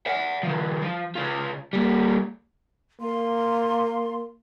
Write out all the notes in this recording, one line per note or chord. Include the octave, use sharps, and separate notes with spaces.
E5 F#5
D#3 F3
F3
C#3 F4
G3 A#3
A#3 C6